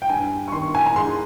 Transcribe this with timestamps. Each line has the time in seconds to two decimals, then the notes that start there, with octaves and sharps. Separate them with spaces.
0.02 G5
0.09 G2 G#5
0.48 C#6
0.52 D#3 C6
0.75 G#5
0.86 A#5
0.96 G#2 C6